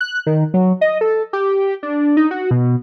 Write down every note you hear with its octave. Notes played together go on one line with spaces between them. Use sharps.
F#6
D#3
F#3
D#5
A4
G4
D4
D#4
F#4
B2